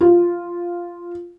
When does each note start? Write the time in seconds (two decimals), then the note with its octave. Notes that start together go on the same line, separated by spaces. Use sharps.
0.01 F4